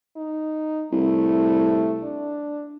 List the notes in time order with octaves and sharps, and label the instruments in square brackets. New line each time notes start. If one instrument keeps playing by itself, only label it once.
[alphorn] D#4
[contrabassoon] C2 [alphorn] A3
[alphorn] D4